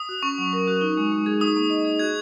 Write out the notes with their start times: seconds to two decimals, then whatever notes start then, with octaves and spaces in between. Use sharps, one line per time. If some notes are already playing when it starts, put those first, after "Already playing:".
Already playing: D#6
0.09 F#4
0.23 C#4 C#6
0.38 F#3
0.53 A#4
0.68 F#4
0.81 D#4
0.97 G#3
1.12 G#3
1.26 G#4
1.40 D#4 D#6
1.56 A#3
1.70 D#5
1.85 G#4
1.99 F#4 G#6